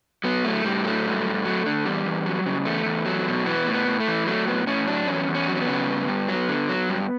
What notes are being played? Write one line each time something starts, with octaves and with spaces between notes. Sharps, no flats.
F#3 B3
A2 A3
A2 G3
F#3 A3
G2
G2
F#3
D3
E2 G3
E2
F#3
C#3
E2 A3
E2
F#3
B2
E3 B3
A2
B3
A2
A3
E3
F#3 A3
A2 B3
A2 C#4
F#3 D4
E2 C#4
E2
C#4
F#3
C#4
B3
C#3
G2
G2
F#3
D3
F#3
G2